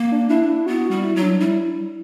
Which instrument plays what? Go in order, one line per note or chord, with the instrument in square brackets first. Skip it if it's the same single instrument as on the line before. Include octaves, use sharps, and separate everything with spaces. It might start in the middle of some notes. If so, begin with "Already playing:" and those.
Already playing: [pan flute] A#3
[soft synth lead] D4
[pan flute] D4 [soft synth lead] E4
[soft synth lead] E4
[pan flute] B3 [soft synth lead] F#4
[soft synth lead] F#4
[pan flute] G3
[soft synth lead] E4
[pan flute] F#3
[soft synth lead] D4
[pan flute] G3 [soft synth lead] E4